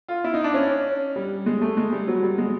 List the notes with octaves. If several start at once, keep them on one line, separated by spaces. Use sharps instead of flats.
F4
E4
D#4
D4
C#4
G3
G#3
A3
G#3
G3
F#3
G3
G#3